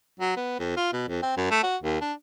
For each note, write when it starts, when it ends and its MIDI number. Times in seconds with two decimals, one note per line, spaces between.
0.20 0.34 54
0.37 0.54 59
0.59 0.73 41
0.77 0.91 65
0.93 1.06 47
1.08 1.22 41
1.22 1.36 60
1.37 1.47 42
1.51 1.60 57
1.63 1.77 66
1.83 1.96 39
2.01 2.13 62